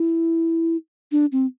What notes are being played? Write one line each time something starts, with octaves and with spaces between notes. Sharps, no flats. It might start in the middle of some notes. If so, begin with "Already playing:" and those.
Already playing: E4
D4
C4